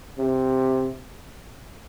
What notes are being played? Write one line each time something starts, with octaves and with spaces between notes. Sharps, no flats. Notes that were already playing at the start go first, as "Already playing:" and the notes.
C3